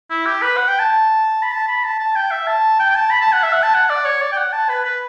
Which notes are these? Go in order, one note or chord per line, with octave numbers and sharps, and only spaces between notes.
E4
G4
B4
F#5
G5
A5
B5
A5
B5
A5
A5
G5
E5
A5
G5
G5
A5
B5
A5
F#5
E5
F#5
A5
F#5
D5
C#5
D5
G5
F#5
A5
B4
B4